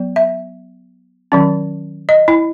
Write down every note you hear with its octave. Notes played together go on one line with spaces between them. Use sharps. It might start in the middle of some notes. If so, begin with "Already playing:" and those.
Already playing: F#3 B3
E5
D#3 F#3 C#4
D#5
E4